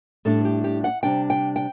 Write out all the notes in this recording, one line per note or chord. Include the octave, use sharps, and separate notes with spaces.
A2 G3 D4 A4
G4
G4
F#5
C3 G3 D4 G5
G5
G5